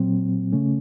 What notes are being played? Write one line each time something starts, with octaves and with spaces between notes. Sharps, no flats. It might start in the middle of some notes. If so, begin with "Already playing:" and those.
Already playing: A#2 F#3 C4
C#3 A3 C#4